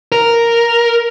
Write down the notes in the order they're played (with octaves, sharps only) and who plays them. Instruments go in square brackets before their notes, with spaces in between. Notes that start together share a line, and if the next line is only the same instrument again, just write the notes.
[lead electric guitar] A#4